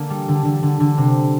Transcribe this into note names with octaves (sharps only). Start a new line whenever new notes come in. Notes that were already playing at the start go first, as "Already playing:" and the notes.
Already playing: D3 A#3 D4
G3
D3
D3
D3
D3
C3